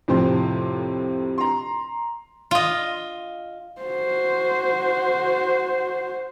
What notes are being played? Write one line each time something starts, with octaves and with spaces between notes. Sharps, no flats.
F2 A2 C3 G4 C5
A#5 C6
F4 D#5
F#4 C5